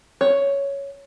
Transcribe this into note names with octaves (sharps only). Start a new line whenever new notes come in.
C#5